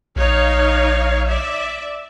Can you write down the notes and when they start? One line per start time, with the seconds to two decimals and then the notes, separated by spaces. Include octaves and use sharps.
0.16 A#1 D#4 C#5 F5
1.26 D5 E5